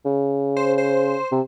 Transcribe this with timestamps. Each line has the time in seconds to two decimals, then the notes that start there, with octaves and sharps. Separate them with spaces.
0.05 C#3
0.57 C5
0.78 C5
1.32 C3